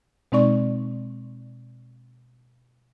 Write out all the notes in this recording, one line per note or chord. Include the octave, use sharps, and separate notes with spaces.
B2 G#3 C4 D#4 D5 C#6